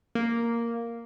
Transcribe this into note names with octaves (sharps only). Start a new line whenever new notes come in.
A#3